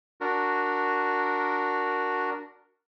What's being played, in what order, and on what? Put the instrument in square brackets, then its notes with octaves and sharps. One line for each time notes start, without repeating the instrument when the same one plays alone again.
[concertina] D4 F#4 A#4